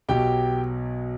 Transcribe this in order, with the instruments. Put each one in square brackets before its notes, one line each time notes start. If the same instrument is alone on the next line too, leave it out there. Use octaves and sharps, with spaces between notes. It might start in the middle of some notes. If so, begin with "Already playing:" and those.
[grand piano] B1 B2 F#3 G4 G5